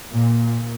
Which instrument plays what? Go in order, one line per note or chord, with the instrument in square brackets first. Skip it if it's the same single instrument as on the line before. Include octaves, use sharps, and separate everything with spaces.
[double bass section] A#2